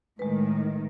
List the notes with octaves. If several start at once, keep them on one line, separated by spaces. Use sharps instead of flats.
A2 D#3 G#3 B4